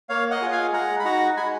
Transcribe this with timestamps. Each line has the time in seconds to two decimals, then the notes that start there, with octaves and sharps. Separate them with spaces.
0.09 A#3 C#5 F5
0.31 D#5 F#5
0.41 F4 G#4
0.52 F5 G#5
0.73 G#3 F#5 A#5
0.99 B5
1.04 D#4 F#4 F#5 A#5
1.37 G#3 G#5 B5